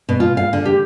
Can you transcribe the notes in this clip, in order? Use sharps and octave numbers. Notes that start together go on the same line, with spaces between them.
B2
F4
F5
D3
G4